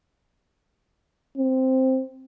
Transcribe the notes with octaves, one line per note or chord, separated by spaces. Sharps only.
C4